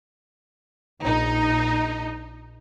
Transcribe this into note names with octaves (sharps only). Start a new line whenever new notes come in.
A#1 D#4